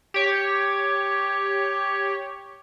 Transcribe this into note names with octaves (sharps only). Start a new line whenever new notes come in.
G4 C#5